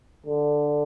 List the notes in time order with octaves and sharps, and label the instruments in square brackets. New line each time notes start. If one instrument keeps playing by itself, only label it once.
[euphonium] D3